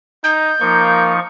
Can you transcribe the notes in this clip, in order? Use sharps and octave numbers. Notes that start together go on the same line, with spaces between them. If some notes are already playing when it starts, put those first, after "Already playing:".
D#4 G6
F3 A#3 D#4 C#6